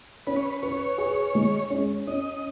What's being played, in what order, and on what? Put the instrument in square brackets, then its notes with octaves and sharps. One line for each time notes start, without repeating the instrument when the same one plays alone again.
[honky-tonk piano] C#4 [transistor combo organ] B4
[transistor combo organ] C#5
B4
[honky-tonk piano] B4 [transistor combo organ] C#5
[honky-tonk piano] G#4
G#3
C#4
[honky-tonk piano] C#4 [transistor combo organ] D#5